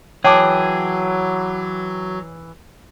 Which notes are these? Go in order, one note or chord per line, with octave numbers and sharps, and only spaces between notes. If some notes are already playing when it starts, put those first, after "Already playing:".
E3 F#3 G#4 C#5 G5 A5 D6